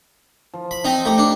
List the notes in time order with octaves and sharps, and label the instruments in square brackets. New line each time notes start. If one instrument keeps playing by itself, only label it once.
[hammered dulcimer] F3
[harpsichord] B5
C4 D#4
[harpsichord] A3 [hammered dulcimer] D#4 G4
[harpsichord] D4